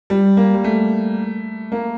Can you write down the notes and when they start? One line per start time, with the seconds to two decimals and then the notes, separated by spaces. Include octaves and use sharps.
0.10 G3
0.37 A#3
0.54 G3
0.64 A3
1.72 A#3